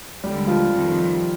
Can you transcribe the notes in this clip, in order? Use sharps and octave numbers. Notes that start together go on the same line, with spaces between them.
D#2 D3 G3 G#3 G4
F3 F4
F2 C3 D#3